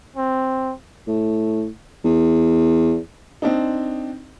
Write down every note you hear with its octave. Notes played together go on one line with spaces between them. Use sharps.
C4
A2
E2
C4 D4 D#4